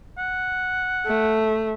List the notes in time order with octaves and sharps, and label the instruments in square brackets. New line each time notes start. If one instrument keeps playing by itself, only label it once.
[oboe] F#5
[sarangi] A3